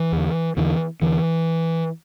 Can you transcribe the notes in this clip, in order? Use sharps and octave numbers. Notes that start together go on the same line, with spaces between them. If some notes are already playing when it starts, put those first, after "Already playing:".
Already playing: E3
E2 D3
E2 D3 E3
E2 D3 E3